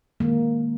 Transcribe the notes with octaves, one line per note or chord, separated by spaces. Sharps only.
D#3 G#3 A#3